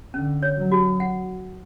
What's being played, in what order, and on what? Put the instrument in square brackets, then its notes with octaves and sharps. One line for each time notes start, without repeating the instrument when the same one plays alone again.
[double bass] D3 [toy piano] C#4
[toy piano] C#5
[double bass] F#3
[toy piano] F#4
F#5